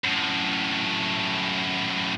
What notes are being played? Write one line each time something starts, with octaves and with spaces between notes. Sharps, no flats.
F#2 A2